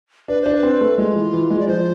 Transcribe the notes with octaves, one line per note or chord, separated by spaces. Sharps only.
D4 B4
D4 C5
B4
C4
A3
G#3 F4
E3
E3
G#3
D5
F3 C5